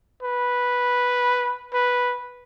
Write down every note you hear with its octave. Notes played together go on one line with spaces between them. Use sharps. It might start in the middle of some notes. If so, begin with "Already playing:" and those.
B4
B4